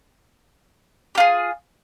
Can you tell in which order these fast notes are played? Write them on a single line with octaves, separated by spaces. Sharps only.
G4 F4 G#4